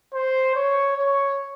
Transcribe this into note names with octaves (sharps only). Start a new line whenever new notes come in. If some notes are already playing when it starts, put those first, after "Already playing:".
C5
C#5
C#5